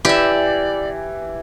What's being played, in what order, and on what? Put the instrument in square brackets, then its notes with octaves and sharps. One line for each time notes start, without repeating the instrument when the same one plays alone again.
[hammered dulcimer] E3 [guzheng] G4 E5 [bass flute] D5